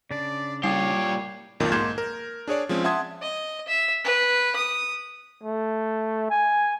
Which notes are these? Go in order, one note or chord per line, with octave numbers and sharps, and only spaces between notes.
C#3 D4 D5
A#2 G3 G4 C#5 C7
B1 F2 A#2 D#3
G#2 A#3 C6 G6 G#6 E7
A#4
D4 G#4 C#5 D5
F3 G#3 C4 C#4
E5 F#5 A5 C6 D#6 G#6
D#5
E5
B4
D#6
A3
G#5